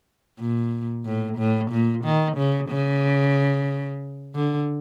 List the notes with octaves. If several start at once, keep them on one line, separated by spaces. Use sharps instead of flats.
A#2
A2
A2
A#2
D#3
C#3
C#3
D3